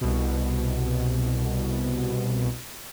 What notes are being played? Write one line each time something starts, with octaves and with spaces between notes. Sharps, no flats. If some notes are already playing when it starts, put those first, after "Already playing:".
C2 B2